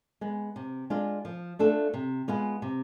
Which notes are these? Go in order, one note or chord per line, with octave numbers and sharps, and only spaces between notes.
G#3 B3
C3
G#3 D4 F4
F3
A3 D4 F4 A4
C3
G#3 B3 F4
C3